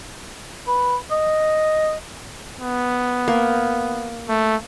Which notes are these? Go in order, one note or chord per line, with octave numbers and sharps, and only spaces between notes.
B4
D#5
B3
A#3
A3